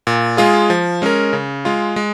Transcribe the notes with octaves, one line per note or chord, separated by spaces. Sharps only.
A#2
G#3 F4 G#4
F3
G#3 C#4 A#4
C#3
G#3 F4
G#3